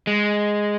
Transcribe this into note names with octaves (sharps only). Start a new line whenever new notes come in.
G#3